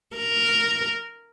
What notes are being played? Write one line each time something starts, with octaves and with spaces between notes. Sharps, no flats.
A#4